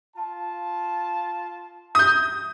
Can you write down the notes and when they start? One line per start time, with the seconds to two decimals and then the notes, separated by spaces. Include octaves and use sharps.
0.16 F4 A5
1.95 D#6 G6